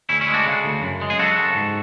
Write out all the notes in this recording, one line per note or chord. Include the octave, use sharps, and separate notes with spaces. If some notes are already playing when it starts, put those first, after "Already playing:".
D2 C#4 E4
C#4 E4
G#3
D4 F#4
C#3
D2
F#2
G#3
G#4
C#3 F#4 A4
F#2
G#2